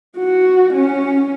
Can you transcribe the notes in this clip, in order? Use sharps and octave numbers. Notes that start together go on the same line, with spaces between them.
F#4
C#4